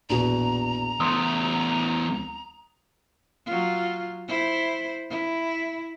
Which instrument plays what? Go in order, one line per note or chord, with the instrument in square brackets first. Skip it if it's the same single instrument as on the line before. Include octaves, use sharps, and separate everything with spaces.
[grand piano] A#1 E2 B2 [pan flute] A#5
[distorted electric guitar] E2 A3 [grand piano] C6 D#6
[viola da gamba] F#3 F4
E4 C5
E4